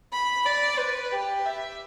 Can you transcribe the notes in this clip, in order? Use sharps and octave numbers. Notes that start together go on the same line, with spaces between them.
B5
D5
B4
G4
E5